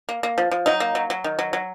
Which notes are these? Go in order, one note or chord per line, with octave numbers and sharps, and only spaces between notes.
A#3
A#3
F3
F3
F#3 D#4
A#3
F#3
F#3
D#3
F#3
F#3